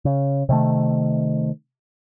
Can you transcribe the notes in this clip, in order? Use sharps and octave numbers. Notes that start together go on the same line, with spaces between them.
C#3
C3 D#3 A3